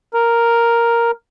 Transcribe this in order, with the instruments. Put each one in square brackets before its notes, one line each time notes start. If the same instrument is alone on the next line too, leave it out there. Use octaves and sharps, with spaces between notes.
[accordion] A#4